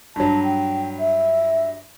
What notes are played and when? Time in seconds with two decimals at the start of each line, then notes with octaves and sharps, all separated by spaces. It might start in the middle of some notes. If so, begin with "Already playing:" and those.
0.16 G2 F#3 A5
0.44 G5
1.00 E5